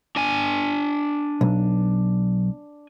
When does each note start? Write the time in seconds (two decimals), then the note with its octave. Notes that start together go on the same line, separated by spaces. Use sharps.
0.16 D4 G#5
1.41 B1